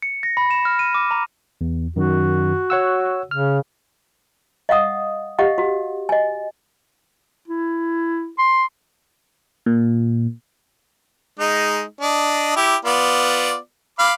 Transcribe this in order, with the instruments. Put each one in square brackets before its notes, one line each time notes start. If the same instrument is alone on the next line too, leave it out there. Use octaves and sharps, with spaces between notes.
[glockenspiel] C#7
A#6
B5
E7
F6
D#7
D6
A#5
[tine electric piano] E2
[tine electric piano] F#2 D#3 [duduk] F#4
[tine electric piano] C#5 F#5 E6
[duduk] C#3 [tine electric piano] F6
[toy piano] D#5 F5 F#5 D#6
G4 D#5 F5 F#5
F#4
D#5 G#5
[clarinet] E4
C6
[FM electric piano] A#2
[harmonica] G#3 D#4
D4 D#5
E4 G4
B3 F4 D5
F5 B5 D6